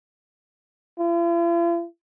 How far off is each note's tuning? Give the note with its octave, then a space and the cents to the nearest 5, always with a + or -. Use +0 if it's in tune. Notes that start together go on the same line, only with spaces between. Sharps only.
F4 -45